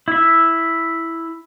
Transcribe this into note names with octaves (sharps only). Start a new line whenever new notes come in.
E4 E5